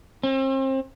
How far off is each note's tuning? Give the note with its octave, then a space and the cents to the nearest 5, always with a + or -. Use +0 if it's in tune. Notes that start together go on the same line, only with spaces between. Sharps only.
C4 +35